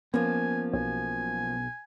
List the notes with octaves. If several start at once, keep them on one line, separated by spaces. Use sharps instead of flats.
F3 A#3 B3 C#4 G#5
B1 G#5